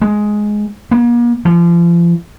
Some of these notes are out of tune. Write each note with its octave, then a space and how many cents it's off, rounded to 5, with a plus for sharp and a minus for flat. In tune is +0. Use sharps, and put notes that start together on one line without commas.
G#3 +10
A#3 +40
F3 -35